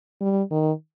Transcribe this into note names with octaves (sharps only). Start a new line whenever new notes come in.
G3
D#3